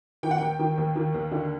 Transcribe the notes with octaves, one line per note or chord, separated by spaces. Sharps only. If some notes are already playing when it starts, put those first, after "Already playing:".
D#3 G5
F#5
D#2 G5
D#3
D#2
D#3
D#2
D3